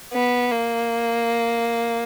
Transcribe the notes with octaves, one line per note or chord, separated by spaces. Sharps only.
B3
A#3